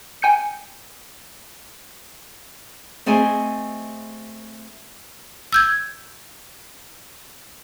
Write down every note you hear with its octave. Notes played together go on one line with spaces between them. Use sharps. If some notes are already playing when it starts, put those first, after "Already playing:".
G5 G#5 G6 C#7
A3 C4 G#4 D#5 G#5
E6 G6 G#6